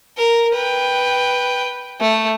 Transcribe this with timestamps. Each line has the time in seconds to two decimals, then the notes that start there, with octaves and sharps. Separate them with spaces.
0.18 A#4
0.54 B4 G5
2.01 A3